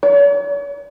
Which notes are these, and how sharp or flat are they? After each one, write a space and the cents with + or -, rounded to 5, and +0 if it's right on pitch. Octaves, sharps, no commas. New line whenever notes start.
C#5 +45